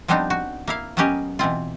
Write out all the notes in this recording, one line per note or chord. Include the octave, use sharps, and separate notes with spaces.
F3 G3 B3 C4 D4 D#4
F#4
A#3 E4 F5
F#3 A#3 B3 C#4 G4 D#5
B2 E3 C4 F4